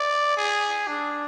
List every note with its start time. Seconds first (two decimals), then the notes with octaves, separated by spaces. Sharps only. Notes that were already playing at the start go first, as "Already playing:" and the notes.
Already playing: D5
0.37 G#4
0.88 D4